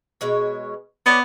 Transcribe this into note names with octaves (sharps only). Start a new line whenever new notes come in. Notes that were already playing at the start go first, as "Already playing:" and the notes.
B2 G#3 C#5
B3 C#4 D5 F#5